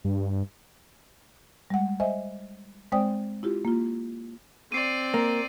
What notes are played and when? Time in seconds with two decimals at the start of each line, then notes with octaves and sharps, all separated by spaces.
0.04 G2
1.70 G3 G#3 F#5
2.00 C5 D#5 E5 G#5
2.92 G#3 C4 C5 D5 G5 D#6
3.43 E4 F4 G4
3.65 A#3 F4
4.72 C4 D5 C7 D#7
5.14 A#3